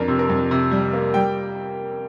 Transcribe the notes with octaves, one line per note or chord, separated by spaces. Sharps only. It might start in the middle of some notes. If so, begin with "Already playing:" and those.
Already playing: F2 D4 A#4
C3
A#4
F2
C3
G3
A#3
G3 G5